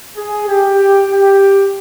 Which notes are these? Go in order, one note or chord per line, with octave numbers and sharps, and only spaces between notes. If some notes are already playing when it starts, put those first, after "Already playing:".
G#4
G4
G4